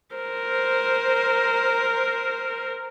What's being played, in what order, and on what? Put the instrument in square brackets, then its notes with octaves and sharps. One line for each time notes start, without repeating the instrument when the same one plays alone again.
[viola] A#4 C5